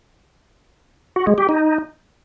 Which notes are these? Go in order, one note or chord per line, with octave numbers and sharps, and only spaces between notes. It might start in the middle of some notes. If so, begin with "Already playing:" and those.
F#4
G#3
G4
D#4